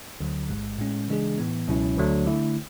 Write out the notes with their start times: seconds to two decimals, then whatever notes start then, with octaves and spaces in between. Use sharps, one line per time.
0.20 D2 D3 F#3
0.49 A1 G#2 G#3
0.79 A2 G#3 C#4
1.08 C#3 E3 G#3 D4 G#4
1.38 A2 E3 B3
1.68 C#2 B2 F#3 C#4 E4
1.97 D2 D3 F#3 A3 D4
2.26 D3 A3 E4